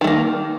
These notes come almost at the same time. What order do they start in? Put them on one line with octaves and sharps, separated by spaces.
D#3 A3 A#3